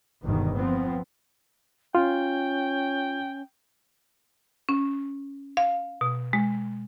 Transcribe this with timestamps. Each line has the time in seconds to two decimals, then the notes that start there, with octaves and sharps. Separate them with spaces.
0.22 G1 E2 G#2 B2 D#3
0.55 F3 B3 C4
1.95 C#4 F4 G5
4.69 C#4
5.57 F5
6.01 B2
6.33 G#3